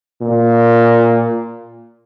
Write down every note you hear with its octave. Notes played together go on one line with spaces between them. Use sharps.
A#2